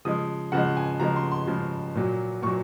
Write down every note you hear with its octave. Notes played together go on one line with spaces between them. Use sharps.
C#3 F3 G#3 D#6
C#3 F3 G#3 F#5
G#5
C#3 F3 G#3 A#5
C6
C6
C#3 F3 G#3
A#2 F#3
A#2 F#3 C#6